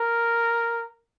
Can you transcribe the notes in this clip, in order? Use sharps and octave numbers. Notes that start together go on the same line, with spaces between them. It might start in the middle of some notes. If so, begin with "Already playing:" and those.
Already playing: A#4